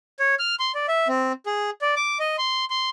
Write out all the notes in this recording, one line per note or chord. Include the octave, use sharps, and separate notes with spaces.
C#5
F6
C6
D5
E5
C4
G#4
D5
D6
D#5
C6
C6